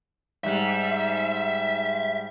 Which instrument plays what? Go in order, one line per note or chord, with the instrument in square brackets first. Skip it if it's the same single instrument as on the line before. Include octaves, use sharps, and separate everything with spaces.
[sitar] G#2 G3 [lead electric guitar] E5